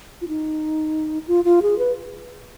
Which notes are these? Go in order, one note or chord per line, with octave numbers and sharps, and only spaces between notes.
F4
D#4
F4
F4
G#4
B4